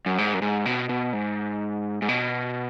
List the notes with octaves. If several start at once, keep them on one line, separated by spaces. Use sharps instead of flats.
F#2
G#2
F#2
G#2
B2
B2
G#2
G#2
B2